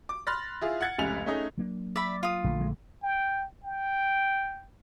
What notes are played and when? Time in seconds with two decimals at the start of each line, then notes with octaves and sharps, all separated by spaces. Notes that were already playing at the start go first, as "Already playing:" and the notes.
0.09 D6
0.27 B5 C6 F6 F#6 A6 A#6
0.61 E4 F4 G#4
0.81 F#5 F#6 G#6 A6 C#7
0.98 F1 C#2 G#5 F7
1.26 A3 C#4 D#4 G#4
1.58 F#3 A#3 D4
1.96 D5 E5 B5
2.23 F4 D#6
2.44 A#1 D3 A3
2.61 G#3
3.03 G5
3.64 G5